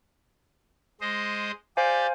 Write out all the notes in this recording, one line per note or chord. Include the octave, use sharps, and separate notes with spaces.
G#3 C5 D#5
G4 C5 D5 F5 G#5